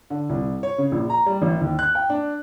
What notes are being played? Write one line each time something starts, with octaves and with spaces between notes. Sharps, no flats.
D3
C2
C#5
C#3
A#1
A#5
G3
A1
D#2
F#6
G5
D4